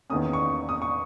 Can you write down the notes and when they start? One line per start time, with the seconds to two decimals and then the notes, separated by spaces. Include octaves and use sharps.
0.10 E2 D#3 A#3 C#4 D#6
0.33 C#6
0.69 D#6
0.82 C#6